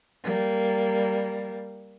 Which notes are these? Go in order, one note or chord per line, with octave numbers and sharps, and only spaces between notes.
G3 A#3